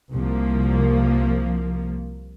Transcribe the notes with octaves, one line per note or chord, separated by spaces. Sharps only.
C2 F3 A#3